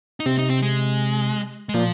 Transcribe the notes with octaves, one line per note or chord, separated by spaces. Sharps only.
D#4
C3 C4
D#4
C4
G#3
G#3
A#2 F3